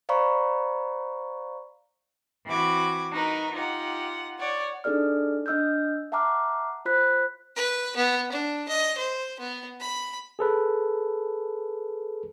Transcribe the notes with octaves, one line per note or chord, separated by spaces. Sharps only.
C5 D5 F5 A#5 B5 C#6
E3 C4 F#4 B5 D6 G#6
D#4 F#4 A#4 B4
D#4 F4 G4 F#5
C#5 D5 F#5
D4 D#4 G#4 A4 D5 F6
D4 D#5 E6 F6 G6
E5 F#5 A5 A#5 D6 F6
F4 C5 B5 F#6 B6
B4
B3
D4
D#5
C5
B3
B5
G#4 A4 B4